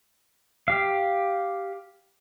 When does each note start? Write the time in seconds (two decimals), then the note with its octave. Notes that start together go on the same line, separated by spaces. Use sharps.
0.68 G4 F5